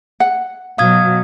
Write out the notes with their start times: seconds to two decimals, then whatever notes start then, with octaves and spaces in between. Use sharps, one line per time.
0.20 F#5
0.78 B2 F#3 F5 D#6 G#6